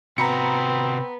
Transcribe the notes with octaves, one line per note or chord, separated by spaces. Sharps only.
C3 B3 C4 F#4 A#5 B5 C#7